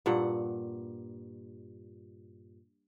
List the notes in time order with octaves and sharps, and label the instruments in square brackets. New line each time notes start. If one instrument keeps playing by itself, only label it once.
[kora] G2 A#2 F#5